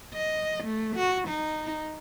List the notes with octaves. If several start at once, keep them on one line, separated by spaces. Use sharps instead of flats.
D#5
A3
F#4
D#4